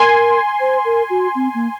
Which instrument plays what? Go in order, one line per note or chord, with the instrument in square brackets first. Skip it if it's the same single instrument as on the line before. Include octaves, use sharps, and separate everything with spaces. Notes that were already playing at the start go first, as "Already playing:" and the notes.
Already playing: [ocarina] A#4 [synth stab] G#5 C6
[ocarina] C5
A#4
F#4
C4
A#3